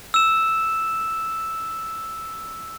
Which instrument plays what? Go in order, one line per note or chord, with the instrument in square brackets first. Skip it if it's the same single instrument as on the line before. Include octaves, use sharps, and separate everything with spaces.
[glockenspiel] E6 E7